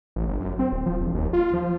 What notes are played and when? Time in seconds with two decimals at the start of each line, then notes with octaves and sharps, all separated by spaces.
0.16 A1
0.28 G1
0.40 F#2
0.59 C4
0.72 D1
0.86 F3
1.01 E1
1.15 D#2
1.33 F4
1.54 F3